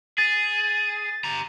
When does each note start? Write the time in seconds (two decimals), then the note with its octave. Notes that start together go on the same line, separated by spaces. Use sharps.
0.18 G#4 A6
1.24 G4 A#5